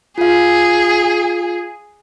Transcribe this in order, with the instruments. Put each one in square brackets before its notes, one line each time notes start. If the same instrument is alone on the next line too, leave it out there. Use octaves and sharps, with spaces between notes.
[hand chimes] F4 F5 [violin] G#4